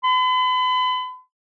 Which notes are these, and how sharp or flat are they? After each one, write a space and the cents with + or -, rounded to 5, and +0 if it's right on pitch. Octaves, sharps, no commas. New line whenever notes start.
B5 +40